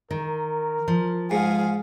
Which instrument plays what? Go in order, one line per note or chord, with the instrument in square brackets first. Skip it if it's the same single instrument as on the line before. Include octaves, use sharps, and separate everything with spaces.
[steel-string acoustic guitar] D#3 [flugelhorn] A#4
[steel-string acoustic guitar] F3
[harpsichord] G#2 [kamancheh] G#4 F5